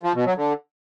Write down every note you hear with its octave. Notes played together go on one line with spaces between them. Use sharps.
F3
B2
F#3
D3